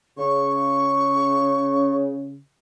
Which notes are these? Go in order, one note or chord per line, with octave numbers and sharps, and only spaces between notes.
C#3 C#6